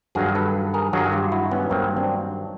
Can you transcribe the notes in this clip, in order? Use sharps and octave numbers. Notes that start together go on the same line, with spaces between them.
G2 D#3 F#3 F#4 G#4
A4 B4
G#4 A#4
G2 D#3 F#3 F#4 G#4
F4 G4
E4 F#4
B3 C#4
G2 D#3 F#3 A#3 C4
C4 D4